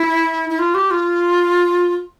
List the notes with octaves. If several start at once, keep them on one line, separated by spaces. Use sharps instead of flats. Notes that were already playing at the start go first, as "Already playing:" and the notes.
Already playing: E4
E4
F4
G4
F4